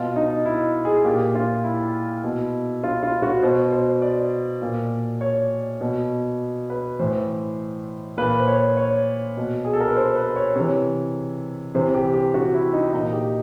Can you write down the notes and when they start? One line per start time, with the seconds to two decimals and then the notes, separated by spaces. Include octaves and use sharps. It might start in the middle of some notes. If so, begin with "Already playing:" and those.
Already playing: B2 F4
0.16 D#4
0.46 E4
0.85 G#4
1.05 A#2 G4
1.35 F4
1.64 E4
2.24 B2
2.84 F4
3.03 F4
3.22 F#4
3.42 B2 C5
3.72 C5
4.02 D5
4.62 A#2
5.21 C#5
5.81 B2
6.70 B4
6.99 A2 E3 C5
8.17 A#2 B4
8.40 C5
8.48 C#5
8.77 C#5
9.37 B2
9.65 G#4
9.73 A4
9.80 A#4
9.88 B4
9.97 C5
10.16 B4
10.36 C#5
10.55 C3 E3 C#5
11.75 C3 E3 C5
11.95 G4
12.14 G4
12.34 F#4
12.54 E4
12.73 D#4
12.93 A#2 D#4
13.13 G4